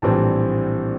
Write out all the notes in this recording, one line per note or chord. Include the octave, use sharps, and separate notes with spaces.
A#1 A2 E3 G3 C4 A5